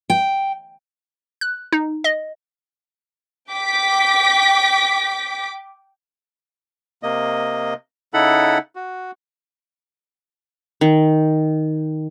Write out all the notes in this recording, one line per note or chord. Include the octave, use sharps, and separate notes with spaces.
G5
F#6
D#4
D#5
G5 D6 B6
C3 A#3 D#5
C#3 D#4 E4 A4 F#5 B5
F#4
D#3